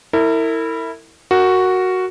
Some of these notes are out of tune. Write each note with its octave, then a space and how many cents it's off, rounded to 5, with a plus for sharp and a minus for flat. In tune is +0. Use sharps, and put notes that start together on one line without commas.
E4 -10 A#4 -40
F#4 +0 A#4 -10